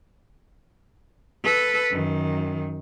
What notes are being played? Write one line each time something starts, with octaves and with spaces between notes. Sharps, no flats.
A4 B4
F#2 D#3